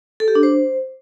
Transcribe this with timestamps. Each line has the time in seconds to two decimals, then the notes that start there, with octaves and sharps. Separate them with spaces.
0.20 A4
0.28 G4
0.35 D4
0.43 C5